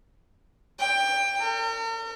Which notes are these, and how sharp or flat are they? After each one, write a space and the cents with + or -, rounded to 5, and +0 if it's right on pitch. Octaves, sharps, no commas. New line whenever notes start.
G5 +20
A#4 -45